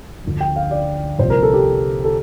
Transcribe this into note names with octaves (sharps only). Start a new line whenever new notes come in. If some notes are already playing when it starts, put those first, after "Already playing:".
D2 D3 F3
G5
F5
D5
C2 A#2 F3 C5
A#4
A4
G4
A4